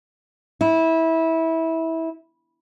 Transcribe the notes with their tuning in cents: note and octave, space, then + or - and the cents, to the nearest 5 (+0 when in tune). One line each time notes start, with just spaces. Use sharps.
E4 -20